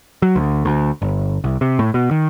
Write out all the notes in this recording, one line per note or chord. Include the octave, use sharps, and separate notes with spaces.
F#3
D2
D2
G1
C2
C3
A2
B2
D#3